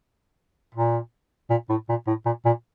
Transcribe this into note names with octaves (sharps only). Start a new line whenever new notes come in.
A#2
A#2
A2
A#2
A2
A#2
A#2